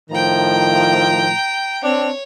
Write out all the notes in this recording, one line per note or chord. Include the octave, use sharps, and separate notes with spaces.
A2 D#3 F3 G5 A#5
C4 D4 C#5